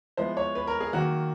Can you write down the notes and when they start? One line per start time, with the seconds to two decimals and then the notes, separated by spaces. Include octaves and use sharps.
0.17 F3 G#3 B3 E4 C5
0.37 C#5
0.55 B4
0.67 A#4
0.80 G#4
0.93 D#3 F#3 A#3 F#4